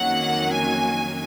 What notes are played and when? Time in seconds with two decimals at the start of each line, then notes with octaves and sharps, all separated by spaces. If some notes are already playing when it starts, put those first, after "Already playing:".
Already playing: F2 D#3 F#3 A#3 C#4 F#5
0.52 G#5